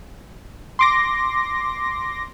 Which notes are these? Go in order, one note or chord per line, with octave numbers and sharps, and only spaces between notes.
C6 D6 A#6